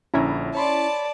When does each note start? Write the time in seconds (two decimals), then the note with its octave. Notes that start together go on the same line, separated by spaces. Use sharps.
0.14 A#1 D3 C#4 E4 A#5
0.55 C#5 D5 A5 B5 C6